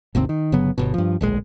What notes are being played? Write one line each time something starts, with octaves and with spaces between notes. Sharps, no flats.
G#1 D#2 C3 C4
D#3
G1 C#3 F#3 B3
G1 B2
G2 F3
D1 A#1 G#3